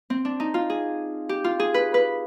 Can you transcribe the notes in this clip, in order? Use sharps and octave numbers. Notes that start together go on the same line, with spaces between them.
C4
D4
D#4
F4
G#4
G4
F4
G#4
B4
B4